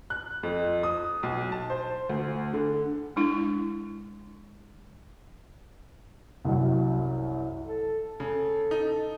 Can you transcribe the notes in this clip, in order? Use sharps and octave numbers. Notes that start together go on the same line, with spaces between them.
F#6
F2
D#6
B1
A5
C5
D2
D3
G#3 D4 E4
C2 F#2
A4
C#3 A4
D#4